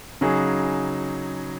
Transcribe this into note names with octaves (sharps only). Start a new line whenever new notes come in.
C#3 F#3 D#4 G#4